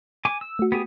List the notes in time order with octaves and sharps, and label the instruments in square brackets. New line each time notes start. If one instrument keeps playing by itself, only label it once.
[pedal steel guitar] G#5 D6
E6
[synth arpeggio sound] A3 F#4
[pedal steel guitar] B3 G4 G#4